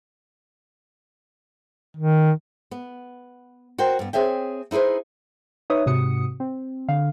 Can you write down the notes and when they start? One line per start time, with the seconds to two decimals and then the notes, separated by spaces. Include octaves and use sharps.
1.97 D#3
2.71 B3
3.78 F#4 A#4 C5 G5
3.99 G2 B3
4.13 C4 G#4 C#5 E5 G5
4.71 D#4 E4 G#4 B4 C5
5.70 D#4 B4 C#5 E5 D#6
5.86 G#2 C3 F#4 D#6 C#7
6.40 C4
6.88 D3 F5